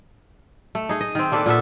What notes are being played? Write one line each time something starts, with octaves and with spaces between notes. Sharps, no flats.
A3
D#4 G#4
D#5
D#3 C4
A#3 D4 A4 B4
A#2 B3 A4 E5